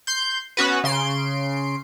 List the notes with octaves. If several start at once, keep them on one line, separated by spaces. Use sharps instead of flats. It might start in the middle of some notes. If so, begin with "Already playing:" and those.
C6 G6
B3 C#4 F#4 B4
C#3 C6 D7